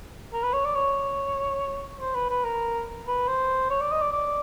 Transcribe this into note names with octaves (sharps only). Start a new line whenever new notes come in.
A#4
B4
C#5
D5
C#5
C5
B4
B4
A#4
B4
C5
C#5
D5
D#5
D5
D5